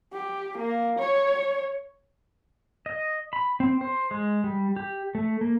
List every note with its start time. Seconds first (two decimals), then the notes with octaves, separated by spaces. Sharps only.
0.13 G4
0.58 A#3
0.99 C#5
2.86 D#5
3.33 B5
3.60 C4
3.81 C5
4.11 G#3
4.44 G3
4.76 G4
5.15 A3
5.41 A#3